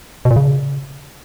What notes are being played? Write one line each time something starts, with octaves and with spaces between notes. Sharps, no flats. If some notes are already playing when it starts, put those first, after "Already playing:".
B2
A#2
C#3